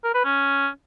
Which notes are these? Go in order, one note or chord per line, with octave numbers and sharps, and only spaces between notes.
A#4
B4
C#4